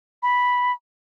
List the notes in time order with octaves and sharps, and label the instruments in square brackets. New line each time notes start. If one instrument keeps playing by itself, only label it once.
[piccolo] B5